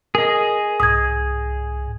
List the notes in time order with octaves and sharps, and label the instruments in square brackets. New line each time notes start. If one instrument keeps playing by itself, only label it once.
[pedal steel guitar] G#4 D#5 [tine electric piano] A#4
[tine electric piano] C2 G#2 [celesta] D#6 G#6